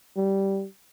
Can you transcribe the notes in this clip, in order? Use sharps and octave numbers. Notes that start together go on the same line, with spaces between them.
G3